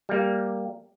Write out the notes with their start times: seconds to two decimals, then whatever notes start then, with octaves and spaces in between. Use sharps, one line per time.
0.09 G3 A#3